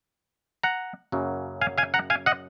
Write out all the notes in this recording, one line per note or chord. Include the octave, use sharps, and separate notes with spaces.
F#5 A#5
F#2 C#3 F#3 A#3
F5 G#5
F5 G#5
F#5 A#5
F5 G#5
D#5 F#5